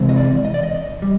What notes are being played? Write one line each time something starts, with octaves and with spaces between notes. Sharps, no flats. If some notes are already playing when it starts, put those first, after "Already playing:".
Already playing: C3 E3 G#3 C4
D#5
D5
D#5
D5
D#5
G3